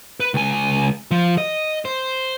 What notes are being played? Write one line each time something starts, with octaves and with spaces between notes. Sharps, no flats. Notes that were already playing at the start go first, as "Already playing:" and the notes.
B4
C#2 G#5
F3
D#5
C5